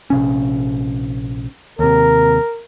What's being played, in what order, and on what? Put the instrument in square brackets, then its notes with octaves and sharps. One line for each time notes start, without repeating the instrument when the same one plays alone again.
[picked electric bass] A#1 C3 C#4
[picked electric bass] D#2 C3 [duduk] A#4